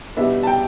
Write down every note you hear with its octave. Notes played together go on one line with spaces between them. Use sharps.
B2 G3 B3 D4 E5
A5
G5